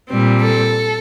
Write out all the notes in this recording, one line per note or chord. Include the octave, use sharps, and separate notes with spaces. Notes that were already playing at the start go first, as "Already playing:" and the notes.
A#2 G3 C4
A4